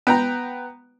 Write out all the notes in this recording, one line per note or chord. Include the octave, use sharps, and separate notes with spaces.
B3 G5 A#5